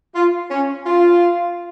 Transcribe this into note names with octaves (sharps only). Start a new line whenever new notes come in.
F4
C#4
F4